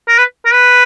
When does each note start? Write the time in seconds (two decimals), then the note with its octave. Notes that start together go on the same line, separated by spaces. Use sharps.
0.08 A#4
0.18 B4
0.45 A#4
0.53 B4